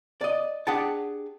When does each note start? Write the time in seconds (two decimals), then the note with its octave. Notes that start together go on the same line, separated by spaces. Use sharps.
0.21 D5 D#5
0.67 D4 G4 G#4 F#5 G5 A5